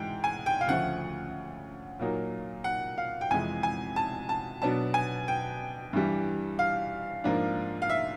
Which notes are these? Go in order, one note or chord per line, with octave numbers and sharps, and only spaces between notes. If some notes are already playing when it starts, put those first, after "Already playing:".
Already playing: G#2 E3 G#3 G5
G#5
G5
F5
D2 C#3 F3 A3 F#5
A#2 F#3 A#3 D#4
F#5
F5
G5
F2 C3 E3 G#3 G#5
G#5
A5
A5
B2 F#3 B3 D4 A5
G#5
G5
G2 E3 G3
F5
G#2 F3 A#3 D4
F5
E5